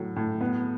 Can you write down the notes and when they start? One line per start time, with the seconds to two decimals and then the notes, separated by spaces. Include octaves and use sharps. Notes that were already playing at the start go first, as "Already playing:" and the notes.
Already playing: A2 F#3
0.16 A2
0.41 B3